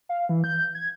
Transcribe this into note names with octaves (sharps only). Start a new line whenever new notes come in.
F5
E3
G6
G#6